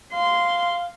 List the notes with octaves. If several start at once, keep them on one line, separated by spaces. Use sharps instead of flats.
F5 C6